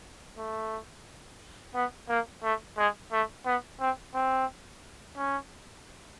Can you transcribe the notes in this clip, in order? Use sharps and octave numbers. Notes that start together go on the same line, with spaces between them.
A3
B3
A#3
A3
G#3
A3
B3
C4
C4
C#4